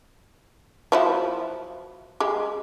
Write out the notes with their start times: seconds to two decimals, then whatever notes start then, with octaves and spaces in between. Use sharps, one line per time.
0.92 F3 F#3 E4
2.20 G#3 G4